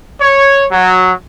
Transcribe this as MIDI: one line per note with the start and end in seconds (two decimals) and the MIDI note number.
0.21 0.65 73
0.71 1.12 54